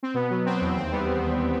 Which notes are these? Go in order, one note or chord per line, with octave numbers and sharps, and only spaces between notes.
C4
B2 B3
F#3 B3
F#3 C4
E2
D#2 C4
G3 B3
G3
D#2